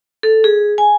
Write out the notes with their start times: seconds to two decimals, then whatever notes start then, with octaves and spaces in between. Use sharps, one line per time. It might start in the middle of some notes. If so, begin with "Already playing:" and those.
0.23 A4
0.44 G#4
0.78 G#5